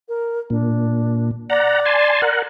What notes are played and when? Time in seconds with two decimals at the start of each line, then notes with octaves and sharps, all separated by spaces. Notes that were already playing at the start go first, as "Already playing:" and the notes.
0.08 A#4
0.50 A#2 D4
1.50 D5 F#5 A#5
1.86 G#5 A5 C6
2.22 A#4 F#5